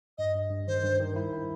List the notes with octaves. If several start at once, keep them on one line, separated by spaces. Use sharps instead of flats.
G2 D#5
G2
G2
D#3 C5
G2
D#3
E4
E4